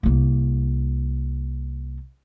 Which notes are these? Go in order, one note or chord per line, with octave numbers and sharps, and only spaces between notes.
C2 A#3